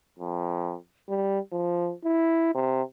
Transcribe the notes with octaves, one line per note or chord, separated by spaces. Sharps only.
F2
G3
F3
E4
C3